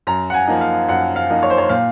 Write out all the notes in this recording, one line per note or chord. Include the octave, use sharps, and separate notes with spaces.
F#2 A#5
F#5
G#5
F3 A#3 D#4
F5
F#2 F#5
F5
F3 A#3 D#4
C#5
C5
C#5
A#2 F5